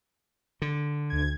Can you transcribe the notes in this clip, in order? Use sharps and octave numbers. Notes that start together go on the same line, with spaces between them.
D3
D2 G#6